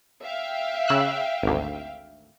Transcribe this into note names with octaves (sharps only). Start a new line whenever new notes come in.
E5 F5 G5
C#3 E6 F#6
G#1 D2